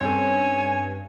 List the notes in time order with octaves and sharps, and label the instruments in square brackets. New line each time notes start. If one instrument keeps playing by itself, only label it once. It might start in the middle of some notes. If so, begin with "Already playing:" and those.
[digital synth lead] G2 [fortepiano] C4 C#4 A4 [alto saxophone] C#5 [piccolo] G#5